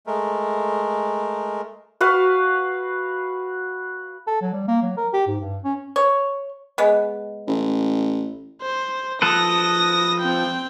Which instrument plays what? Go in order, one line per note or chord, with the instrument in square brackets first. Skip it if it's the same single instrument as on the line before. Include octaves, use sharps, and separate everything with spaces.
[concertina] G#3 A3 A#4
[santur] F#4 B4 F5
[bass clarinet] A4
F#3
G3
A#3
F#3
A#4
G4
G#2
G2
C#4
[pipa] C#5
G#3 B3
[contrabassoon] A1
[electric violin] C5
[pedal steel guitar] F3 A4 B4 [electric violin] D#6 A#6
[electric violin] C4 G5